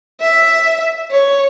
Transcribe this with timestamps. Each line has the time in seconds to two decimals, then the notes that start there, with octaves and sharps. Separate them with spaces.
0.21 E5
1.11 C#5